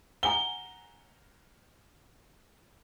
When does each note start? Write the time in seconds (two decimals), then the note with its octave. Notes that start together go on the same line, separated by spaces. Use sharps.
0.23 F#5 G#5 A#5 G7